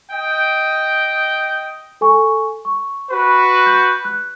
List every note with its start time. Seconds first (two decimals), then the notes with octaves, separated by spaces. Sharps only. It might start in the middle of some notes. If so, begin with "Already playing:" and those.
0.11 D#5 G5
2.01 A4 G#5 C#6
2.65 C#6
3.10 F#4 B4
3.66 G6
4.05 F#6